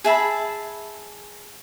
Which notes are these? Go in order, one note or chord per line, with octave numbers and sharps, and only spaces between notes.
G#4 E5 A5 B5